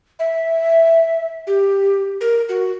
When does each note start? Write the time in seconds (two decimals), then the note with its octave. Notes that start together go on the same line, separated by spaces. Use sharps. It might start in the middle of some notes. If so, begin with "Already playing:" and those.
0.19 E5
1.47 G4
2.21 A#4
2.49 F#4